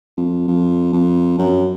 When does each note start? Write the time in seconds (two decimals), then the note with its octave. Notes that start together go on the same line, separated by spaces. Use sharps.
0.17 F2
0.48 F2
0.93 F2
1.38 F#2